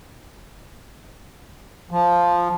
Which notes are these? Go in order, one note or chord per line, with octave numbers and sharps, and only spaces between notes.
F3